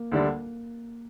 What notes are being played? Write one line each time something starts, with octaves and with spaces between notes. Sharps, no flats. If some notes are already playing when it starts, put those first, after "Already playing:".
Already playing: A#3
D2 D3 G3 D4